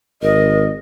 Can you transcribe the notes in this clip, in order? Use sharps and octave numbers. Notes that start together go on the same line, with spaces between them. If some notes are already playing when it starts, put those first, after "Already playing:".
G#1 A#4 D#5